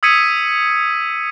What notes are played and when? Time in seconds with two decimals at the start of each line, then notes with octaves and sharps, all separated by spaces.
0.03 D#6 E6 G#6 B6 C#7 D#7